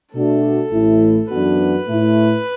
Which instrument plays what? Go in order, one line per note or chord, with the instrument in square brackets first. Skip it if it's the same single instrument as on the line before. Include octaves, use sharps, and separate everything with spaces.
[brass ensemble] B2 A3 D4 F#4 [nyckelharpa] A4
[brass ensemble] A1 A2 A3 E4
[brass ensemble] F#2 E3 B3 D4 F#4 [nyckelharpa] B4
[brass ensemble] A2 A3 E4